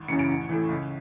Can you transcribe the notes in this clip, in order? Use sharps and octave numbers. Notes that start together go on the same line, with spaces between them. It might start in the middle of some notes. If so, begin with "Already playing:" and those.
Already playing: G#1
F#2 C#3 E3 C#7
D7
A1
A2 E3
C#2